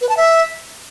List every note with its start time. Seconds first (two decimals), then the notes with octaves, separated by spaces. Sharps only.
0.01 B4
0.09 A5
0.17 E5